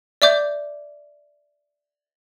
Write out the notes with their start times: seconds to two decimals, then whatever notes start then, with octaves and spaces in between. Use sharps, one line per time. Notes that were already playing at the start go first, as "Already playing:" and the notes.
0.22 D5 E5 D6 G6